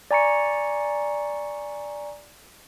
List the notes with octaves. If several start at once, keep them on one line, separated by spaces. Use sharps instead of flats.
D5 G#5 A#5 C#6 C#7